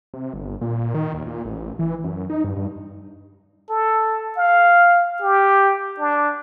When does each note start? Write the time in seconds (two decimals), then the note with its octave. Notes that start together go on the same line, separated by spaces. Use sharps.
0.14 C3
0.33 G1
0.61 A#2
0.94 D#3
1.14 D#2
1.27 A#2
1.45 A1
1.79 E3
2.04 F#2
2.30 D#4
2.44 G2
2.57 G2
3.70 A4
4.37 F5
5.22 G4
5.99 D4